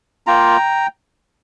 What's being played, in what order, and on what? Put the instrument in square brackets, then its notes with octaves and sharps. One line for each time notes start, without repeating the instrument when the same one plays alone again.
[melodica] A#3 F4 G5 A#5